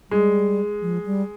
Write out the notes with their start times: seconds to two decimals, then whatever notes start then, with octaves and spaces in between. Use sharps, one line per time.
0.11 G3 G#3
0.82 F3
1.06 G3